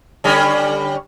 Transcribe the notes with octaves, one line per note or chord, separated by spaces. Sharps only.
D3 G3 C#4